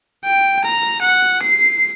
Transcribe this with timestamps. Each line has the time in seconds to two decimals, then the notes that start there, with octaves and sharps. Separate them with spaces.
0.25 G5
0.65 A#5
1.02 F#5
1.42 C7